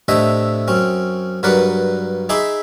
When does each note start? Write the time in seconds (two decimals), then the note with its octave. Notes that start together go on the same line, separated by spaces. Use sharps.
0.08 A2 C3 A3 D4 D#5 E5
0.68 F#2 C4 C#4
1.43 G2 F#3 A#4 B4 D5 F#5
2.29 D#4 G#4 E5 B5 C6 D6